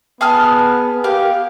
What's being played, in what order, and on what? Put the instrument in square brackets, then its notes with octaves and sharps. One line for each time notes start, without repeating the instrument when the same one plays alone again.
[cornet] B3 [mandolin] G#4 A5 F6
[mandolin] A#3 F5 [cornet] G4